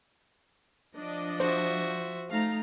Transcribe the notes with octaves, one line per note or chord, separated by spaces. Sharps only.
F3 D4 D5 D#5
F#4 C5 E5
A3 D#4 F5 A#5